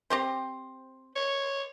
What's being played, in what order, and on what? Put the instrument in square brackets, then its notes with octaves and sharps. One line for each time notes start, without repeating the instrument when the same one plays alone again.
[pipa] C4 G4 C5
[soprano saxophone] C#5